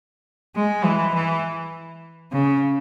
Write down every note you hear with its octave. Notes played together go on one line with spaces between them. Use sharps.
G#3
E3
E3
C#3